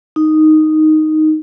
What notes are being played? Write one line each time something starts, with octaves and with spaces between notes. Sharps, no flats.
D#4